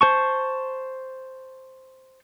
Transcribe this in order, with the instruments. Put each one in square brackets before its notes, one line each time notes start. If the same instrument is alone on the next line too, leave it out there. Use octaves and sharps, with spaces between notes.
[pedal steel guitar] C5 A5 C#6